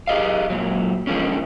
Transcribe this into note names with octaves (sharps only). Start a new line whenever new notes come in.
G4 G#4 D#5 F5
F#2 A#2 F#3
D3 F3 G#3 A#3 C#4